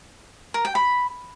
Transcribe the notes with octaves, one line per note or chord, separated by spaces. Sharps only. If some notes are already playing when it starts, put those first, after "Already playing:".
A#4
G5
B5